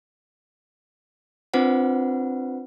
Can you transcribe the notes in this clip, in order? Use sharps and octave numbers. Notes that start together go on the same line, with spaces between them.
C4 D4 F4 B4 C5 F#5